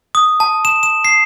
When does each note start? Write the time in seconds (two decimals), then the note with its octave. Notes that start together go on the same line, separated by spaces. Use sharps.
0.15 D#6
0.40 A5
0.65 E7
0.83 E7
1.05 C7